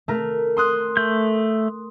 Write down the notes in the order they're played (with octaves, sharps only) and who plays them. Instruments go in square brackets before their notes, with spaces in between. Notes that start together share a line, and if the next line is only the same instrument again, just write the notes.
[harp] A3 A#4
C6 D#6 F#6
[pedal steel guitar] A3 G6